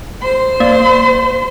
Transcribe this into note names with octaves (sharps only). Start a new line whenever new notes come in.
C5 C6
A#3 D5